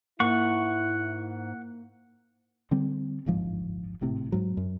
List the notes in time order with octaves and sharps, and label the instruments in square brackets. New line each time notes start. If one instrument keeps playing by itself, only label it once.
[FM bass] G#2 [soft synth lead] A#3 [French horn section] E4 [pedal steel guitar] F#5 C#6
[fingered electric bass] D3 G3 C4
D1 G1 G#2 F3
G#1 A2 C3
G#2 F#3
F#2